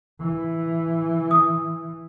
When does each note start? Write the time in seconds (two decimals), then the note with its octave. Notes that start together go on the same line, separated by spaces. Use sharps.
0.21 E3
1.31 D#6